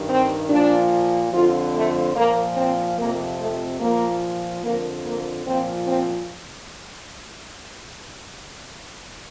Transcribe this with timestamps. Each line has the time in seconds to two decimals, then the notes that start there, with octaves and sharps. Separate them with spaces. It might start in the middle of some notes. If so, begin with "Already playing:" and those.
Already playing: G2 D#3
0.08 C4
0.49 A#2 F3 D4
1.32 F2 D3 F3 F4
1.73 A3
2.15 A#2 F3 A#3
2.56 C4
2.97 F2 C3 F3 A#3
3.39 A3
3.80 A#2 F3 A#3
4.62 F2 D3 F3 A#3
5.04 A#3
5.45 A#2 F3 C4
5.86 C4